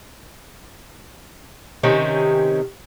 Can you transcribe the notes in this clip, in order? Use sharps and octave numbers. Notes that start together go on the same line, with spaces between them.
C3 D#3 C4 C#4